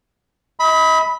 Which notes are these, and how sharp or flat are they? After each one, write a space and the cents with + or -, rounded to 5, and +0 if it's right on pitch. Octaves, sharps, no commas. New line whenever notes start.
D#5 +40 B5 +0